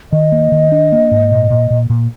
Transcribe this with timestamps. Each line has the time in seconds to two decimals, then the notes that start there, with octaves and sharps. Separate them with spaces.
0.12 D#3 D#5
0.32 A#3
0.52 D#3
0.72 D4
0.92 A#3
1.11 G#2
1.31 A#2
1.50 A#2
1.70 A#2
1.90 A#2